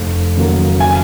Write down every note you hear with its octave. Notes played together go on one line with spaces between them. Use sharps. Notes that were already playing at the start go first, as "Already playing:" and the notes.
Already playing: F1
D#2 C#3 F#3 A#3
G#5